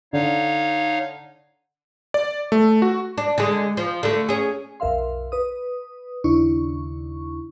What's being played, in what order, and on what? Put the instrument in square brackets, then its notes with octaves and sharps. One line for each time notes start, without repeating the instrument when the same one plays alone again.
[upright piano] D3 [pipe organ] D#4 C#5 F5
[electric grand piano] D5
A3
F#4
[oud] D4
D3 G#3
F3
D3 A3
C#4 G#4
[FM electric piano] B1 F2 A#4 E5 F5 C6
B4 D#6
D#2 C#3 D4 E4 C#6